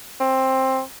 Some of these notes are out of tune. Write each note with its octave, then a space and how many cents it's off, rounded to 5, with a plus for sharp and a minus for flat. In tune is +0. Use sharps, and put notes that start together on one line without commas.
C4 +15